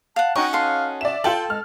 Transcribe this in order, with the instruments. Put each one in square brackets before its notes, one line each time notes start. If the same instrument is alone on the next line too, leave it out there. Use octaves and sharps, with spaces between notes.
[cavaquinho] F5 F#5 [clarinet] A5
[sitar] C#4 D#4 F#4 [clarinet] G5 [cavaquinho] C#6
[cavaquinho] A4 C6 [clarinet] F5
[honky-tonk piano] D5 E7 [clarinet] E5
[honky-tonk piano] F4 G5 F#7 [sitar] A4 [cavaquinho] A5
[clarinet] G#3 [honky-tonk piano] F6